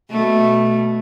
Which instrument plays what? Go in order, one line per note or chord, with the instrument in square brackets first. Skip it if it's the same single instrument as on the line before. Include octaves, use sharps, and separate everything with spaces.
[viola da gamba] B2 A3